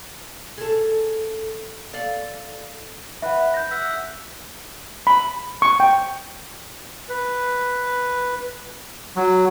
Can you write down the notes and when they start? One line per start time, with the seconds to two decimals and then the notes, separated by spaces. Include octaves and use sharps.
0.58 G#4 A4
1.93 A4 D5 F5
3.22 B4 E5 F#5
3.54 G6 A#6
3.71 E5 F#5
5.07 B5
5.62 C#6
5.80 G5
7.09 B4
9.16 F#3